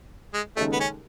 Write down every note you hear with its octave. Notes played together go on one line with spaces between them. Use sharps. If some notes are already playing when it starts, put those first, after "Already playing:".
G#3
D#2 C#3 G#3 A3 D#4 A4
B3
C#4